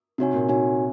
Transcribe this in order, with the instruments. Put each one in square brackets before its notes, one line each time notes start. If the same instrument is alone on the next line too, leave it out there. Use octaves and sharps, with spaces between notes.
[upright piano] C3 [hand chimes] D#4 F#4 C#5 G#5
[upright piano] A#2
[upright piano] A#2 [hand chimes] D#4 F#4 C#5 G#5